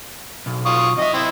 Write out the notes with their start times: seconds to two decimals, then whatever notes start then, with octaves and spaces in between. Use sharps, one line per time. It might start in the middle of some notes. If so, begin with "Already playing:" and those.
0.46 B1
0.66 F4 C#6 D#6
0.98 C3 D#5 E5
1.14 C4 E4